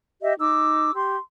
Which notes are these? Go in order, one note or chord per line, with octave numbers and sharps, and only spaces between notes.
G4 D#5 E5
D#4 D6 E6
G4 C6